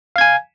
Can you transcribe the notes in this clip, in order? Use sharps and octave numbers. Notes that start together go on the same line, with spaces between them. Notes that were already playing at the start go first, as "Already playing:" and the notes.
F5 G#5 G#6